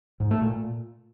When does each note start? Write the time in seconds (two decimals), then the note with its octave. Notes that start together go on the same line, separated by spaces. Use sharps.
0.20 G#2
0.31 A3
0.42 A#2